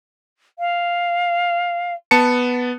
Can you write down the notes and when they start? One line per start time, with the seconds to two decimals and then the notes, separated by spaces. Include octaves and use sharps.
0.59 F5
2.11 B3 A5 C#7